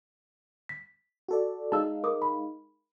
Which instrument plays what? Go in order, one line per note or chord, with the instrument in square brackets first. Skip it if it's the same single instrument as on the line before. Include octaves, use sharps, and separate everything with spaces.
[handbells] B6
[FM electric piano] F#4 A4 D5
[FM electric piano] G#3 D#4 F5 [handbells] A5 E6
[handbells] A#4 D6 D#6
B5